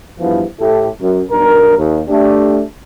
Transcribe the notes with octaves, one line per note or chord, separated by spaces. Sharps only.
E2 G2 E3 F3 B3 E4
A2 E4 G4 A4
F#2
B1 G2 A#4
D#2
A3 D4 G4